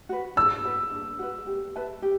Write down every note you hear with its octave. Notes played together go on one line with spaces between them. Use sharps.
F#4 B4
D4 E6
F#4 B4
D4
F#4 B4
G4
B4 E5 A5
G4